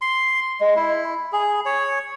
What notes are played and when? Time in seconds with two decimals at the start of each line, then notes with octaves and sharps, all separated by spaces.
0.01 C6
0.61 G#3
0.76 E4
1.32 G#4
1.66 C#5